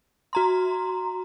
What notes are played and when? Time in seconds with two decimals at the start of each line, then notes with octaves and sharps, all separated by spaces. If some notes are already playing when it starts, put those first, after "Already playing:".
0.33 F#4 A#5 C6